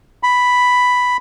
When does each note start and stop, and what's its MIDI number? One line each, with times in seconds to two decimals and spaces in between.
0.23 1.17 83